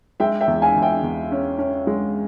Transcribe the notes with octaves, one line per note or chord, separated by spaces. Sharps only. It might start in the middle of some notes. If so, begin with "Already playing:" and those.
G#3 E5 G5
E5 G5
E2
F5 G#5
E2
E5 G5
E2
C#4
C#4
G#3